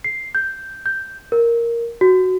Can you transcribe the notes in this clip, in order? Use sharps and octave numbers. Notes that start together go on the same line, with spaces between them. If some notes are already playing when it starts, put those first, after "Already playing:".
C7
G6
G6
A#4
F#4